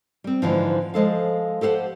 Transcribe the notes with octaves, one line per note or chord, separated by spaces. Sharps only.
G3 C4
G#2 D3 E3 F3
F3 G#3 A4 F5
G4 A4 C5 F5 F#5